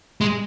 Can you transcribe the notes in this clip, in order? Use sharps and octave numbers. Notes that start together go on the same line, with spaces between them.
G#3